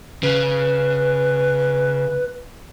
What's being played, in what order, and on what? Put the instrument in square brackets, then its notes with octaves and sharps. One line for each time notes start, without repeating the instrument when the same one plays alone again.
[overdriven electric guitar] C#3 [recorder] B4